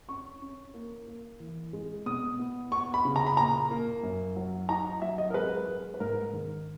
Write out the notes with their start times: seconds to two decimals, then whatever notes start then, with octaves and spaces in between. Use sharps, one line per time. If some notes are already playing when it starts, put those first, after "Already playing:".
0.09 C#4 C#6
0.42 C#4
0.74 A#3
1.07 A#3
1.40 E3
1.73 G#3
2.06 B2 D#6
2.39 B3
2.72 B3 C#6
2.94 B5
3.05 C#3
3.16 A#5
3.26 B5
3.37 A#2 A#5
3.71 A#3
4.03 F#2
4.36 F#3
4.69 D#4 A#5
5.02 F#3 E5
5.18 D#5
5.30 A#4
5.34 G#3 B4
5.68 G#3
5.94 B4
6.00 G#2 A#4
6.33 D#3